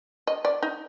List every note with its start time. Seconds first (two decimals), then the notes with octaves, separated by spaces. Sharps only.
0.27 D#5
0.45 D5
0.63 D#4